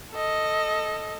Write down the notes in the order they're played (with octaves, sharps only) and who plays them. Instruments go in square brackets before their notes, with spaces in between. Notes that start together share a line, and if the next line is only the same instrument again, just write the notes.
[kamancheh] A4 D#5